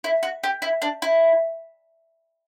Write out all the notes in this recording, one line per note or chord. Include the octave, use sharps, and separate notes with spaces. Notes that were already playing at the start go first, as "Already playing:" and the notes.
E4
F#4
G4
E4
D4
E4